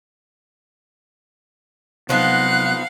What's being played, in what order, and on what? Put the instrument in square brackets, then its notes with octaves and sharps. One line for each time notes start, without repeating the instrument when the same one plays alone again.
[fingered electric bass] C3 F#3 [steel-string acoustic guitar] F3 B3 D#4 [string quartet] F5 F#5 [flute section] F#6